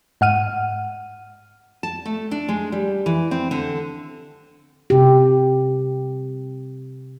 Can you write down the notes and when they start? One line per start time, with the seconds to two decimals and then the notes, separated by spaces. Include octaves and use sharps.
0.21 G#2 F#5 F6 D#7
1.83 A5
2.05 A3
2.31 D4
2.49 G#3
2.72 G3
3.06 E3
3.31 C4
3.51 D3
4.90 C3 G4